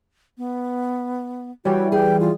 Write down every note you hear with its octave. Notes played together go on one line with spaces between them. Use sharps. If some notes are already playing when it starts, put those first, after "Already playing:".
B3
E3 G3 F#4 C#5 G5
G#4 G5
F4